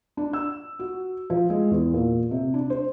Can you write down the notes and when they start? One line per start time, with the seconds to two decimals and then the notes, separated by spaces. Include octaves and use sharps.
0.17 D4
0.33 E6
0.79 F#4
1.30 F3
1.50 G#3
1.71 E2
1.94 A#2
2.31 C3
2.54 D4
2.70 C5